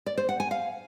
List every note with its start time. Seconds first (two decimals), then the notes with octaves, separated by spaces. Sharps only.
0.06 D5
0.18 C5
0.29 F#5
0.40 G#5
0.51 F5